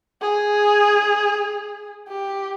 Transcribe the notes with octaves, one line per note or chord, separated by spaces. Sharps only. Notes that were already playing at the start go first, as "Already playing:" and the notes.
G#4
G4